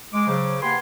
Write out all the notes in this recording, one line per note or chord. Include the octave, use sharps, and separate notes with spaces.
G#3 D6
C#3 F#3 C5 D6
A#3 G4 B4 F#5 G#5 C6